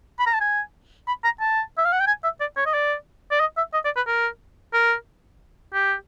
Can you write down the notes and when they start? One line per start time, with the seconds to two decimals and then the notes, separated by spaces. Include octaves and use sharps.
0.20 B5
0.27 A#5
0.34 A5
0.41 G#5
1.08 B5
1.24 A#5
1.41 A5
1.78 E5
1.85 F5
1.93 F#5
2.00 G5
2.07 G#5
2.24 E5
2.40 D5
2.57 C#5
2.66 D#5
2.74 D5
3.31 D5
3.40 D#5
3.57 E5
3.73 D#5
3.85 D5
3.96 B4
4.07 A#4
4.73 A#4
5.74 G4